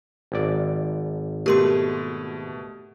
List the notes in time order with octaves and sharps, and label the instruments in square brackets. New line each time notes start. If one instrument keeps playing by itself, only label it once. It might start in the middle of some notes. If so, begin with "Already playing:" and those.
[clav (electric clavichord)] G#1 D5
[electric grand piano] B2 A3 [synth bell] G4 A#4 C6